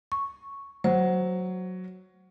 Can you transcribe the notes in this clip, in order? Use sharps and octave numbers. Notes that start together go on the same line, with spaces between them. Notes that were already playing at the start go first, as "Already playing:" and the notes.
C#6
F#3 C5